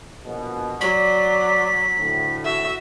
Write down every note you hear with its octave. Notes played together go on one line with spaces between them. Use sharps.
A#1 B2
F#3 D5 B6
D2 A2
F#4 E5